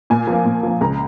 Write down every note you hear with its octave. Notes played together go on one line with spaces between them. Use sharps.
A#2 G#5
F3 A#3
A#2
F3 A#3
C#2 A#5